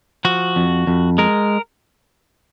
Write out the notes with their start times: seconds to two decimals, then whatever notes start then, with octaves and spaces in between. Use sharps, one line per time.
0.25 F3 F#4
0.56 F2
0.87 F2
1.18 G#3 A#4